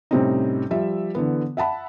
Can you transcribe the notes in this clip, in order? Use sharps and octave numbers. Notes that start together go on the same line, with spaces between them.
A2 C3 G3 C4 C#4 D#4
F3 G3 E5
D3 E3 B3
E5 F#5 A5 B5